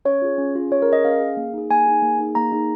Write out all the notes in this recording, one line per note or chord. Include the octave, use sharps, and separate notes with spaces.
C#4 C#5
F4 G#4
C#4
F4 G#4
C#4 C#5
A#4
G#4 D#5
C#4 F5
G#4
A#3
D#4 G#4
A#3 G#5
D#4 G#4
A#3
D#4 G#4
A#3 A#5
D#4 G#4